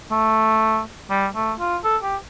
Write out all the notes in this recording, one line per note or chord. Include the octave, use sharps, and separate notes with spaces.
A3
G3
A3
F4
A4
G4